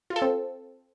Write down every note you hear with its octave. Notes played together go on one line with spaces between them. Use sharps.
F4
A4
C4